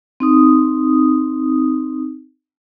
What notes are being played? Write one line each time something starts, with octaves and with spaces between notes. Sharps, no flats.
C4 D#4 D#6